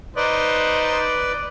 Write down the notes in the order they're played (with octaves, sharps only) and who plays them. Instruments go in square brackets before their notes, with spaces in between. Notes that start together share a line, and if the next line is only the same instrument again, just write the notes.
[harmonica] D#4 C5 D#5 [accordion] B4 D5